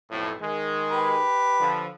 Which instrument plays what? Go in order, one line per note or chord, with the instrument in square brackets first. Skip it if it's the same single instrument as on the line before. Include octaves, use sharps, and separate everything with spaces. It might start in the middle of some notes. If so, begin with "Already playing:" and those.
[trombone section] B1 F2 A2
D#3 G#3
[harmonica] G4 B4
[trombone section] D3 F3